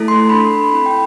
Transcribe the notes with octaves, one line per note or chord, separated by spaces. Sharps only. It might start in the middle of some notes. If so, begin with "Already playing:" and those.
Already playing: A3 E4 A4
C6
D4 A4 B5
C4 E4 A4 B5
G5